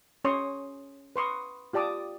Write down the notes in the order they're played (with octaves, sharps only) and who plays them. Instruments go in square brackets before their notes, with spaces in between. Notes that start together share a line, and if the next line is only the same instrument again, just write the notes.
[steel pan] C#4 C#5 C6 C#6 D#6
B4 C6 C#6 D#6
F4 G4 D5 A5 D6 D#6